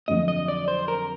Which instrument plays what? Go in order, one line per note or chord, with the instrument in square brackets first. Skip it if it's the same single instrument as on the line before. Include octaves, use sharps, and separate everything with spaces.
[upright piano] F2 D3 F#3 [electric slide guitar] D#5
[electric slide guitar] D#5
D5
C5
A#4